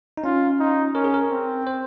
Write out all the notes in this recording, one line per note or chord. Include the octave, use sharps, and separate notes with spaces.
D#4
C#4 F4
D#4
C#4 A#4
G#4
A#4
C4
C5